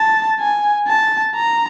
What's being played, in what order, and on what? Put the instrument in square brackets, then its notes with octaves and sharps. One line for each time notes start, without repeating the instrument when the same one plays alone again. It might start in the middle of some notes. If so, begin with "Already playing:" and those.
Already playing: [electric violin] A5
G#5
A5
A#5